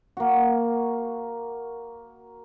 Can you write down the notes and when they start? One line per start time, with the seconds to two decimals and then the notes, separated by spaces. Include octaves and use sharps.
0.17 A#3 F#4